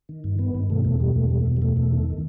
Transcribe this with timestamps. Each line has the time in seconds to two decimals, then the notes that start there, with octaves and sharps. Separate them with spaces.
0.09 D#3
0.24 G2
0.39 D#3 B3
0.55 G2
0.70 B2 A3
0.85 E2 A3
1.00 B2 G3
1.15 E2 A3
1.31 B2 G3
1.41 A3
1.46 E2
1.57 G3
1.62 B2 A3
1.77 E2
1.92 D#3